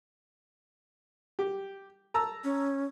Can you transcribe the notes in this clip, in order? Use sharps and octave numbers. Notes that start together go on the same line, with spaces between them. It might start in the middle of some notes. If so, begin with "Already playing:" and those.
G4
A5 A#5 E6
C#4